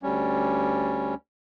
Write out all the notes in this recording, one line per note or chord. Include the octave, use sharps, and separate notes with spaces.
D2 G3 C#4